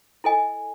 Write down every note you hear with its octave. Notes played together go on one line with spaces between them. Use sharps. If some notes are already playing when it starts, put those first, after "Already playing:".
E4 A4 D#5 G#5